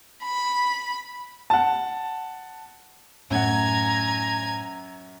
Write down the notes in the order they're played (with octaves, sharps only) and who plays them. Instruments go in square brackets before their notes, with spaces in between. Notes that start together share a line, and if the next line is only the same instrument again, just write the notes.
[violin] B5
[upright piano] F#5 A5
[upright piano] F#2 F#5 [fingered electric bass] A2 [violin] G#5 G#6 [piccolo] A#5